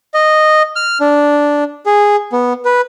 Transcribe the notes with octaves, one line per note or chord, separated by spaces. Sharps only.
D#5
F6
D4
G#4
B3
B4